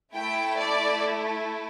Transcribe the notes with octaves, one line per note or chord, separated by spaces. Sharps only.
A3 E4 A4 G5
D5